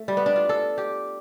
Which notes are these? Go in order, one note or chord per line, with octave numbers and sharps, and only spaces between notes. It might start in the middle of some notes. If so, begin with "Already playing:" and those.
Already playing: A3
G3
B3
D4
F4
A4
G4